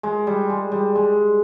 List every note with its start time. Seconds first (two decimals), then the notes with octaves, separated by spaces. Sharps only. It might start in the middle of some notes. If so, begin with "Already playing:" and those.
0.03 G#3
0.27 G3
0.50 G#3
0.72 G3
0.95 G#3